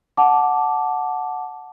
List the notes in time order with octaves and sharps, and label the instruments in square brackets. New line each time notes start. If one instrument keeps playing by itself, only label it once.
[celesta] F#5 A5 D6